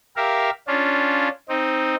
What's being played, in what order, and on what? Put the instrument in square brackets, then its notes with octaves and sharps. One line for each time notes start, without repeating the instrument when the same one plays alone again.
[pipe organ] G4 A#4 E5 F5
C#4 D4 F4
C4 D#4